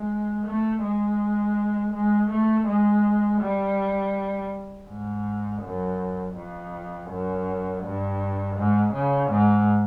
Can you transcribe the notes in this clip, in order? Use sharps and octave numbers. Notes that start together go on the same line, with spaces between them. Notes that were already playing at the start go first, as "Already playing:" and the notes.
Already playing: G#3
A3
G#3
G#3
A3
G#3
G3
G#2
F#2
F2
F#2
G2
G#2
C#3
G#2